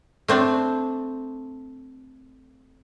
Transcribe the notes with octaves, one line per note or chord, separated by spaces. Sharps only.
A3 C4 D4